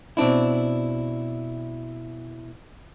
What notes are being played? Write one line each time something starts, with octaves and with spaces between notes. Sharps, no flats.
B2 C4 D4 E4